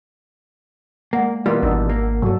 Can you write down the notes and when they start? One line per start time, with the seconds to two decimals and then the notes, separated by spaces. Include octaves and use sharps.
1.13 G#3 A#3 D5 F#5
1.46 B2 E3 G3 A#3 F4
1.63 G#1 D4 D#4 F#5 E6
1.89 A#3
2.22 G2 F#3 G3 A4 D5